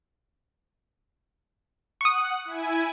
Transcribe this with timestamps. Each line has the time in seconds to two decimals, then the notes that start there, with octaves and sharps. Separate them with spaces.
2.01 F#5 C#6 D#6
2.45 E4 G#5